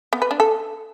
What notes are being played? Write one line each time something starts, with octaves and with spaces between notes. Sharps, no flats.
B3
B4
D4
A4